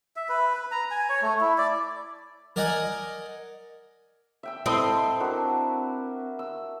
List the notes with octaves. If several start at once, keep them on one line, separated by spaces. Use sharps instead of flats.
E5
B4
B4
A#5
G#5
C#5
A3
E4
D5
A#4 D5 D#5 F#5 G#5 A#5
E5 G5 E6
C4 E4 A4 D#5
D4 F#4 A#4
E6